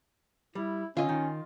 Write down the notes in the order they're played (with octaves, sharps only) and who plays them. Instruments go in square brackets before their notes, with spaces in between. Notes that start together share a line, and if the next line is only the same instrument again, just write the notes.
[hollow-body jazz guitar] G3 [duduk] E4
[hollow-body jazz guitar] D3 [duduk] C#4 [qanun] F4 D#5
[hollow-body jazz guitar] D#3